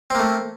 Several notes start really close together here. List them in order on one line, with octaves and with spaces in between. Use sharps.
C4 A#3 A3